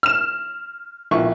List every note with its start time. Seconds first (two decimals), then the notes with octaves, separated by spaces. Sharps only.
0.03 F6 E7
1.11 A#1 E4 C#6